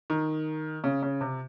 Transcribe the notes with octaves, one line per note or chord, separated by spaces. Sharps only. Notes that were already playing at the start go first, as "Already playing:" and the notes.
D#3
C#3
C#3
C3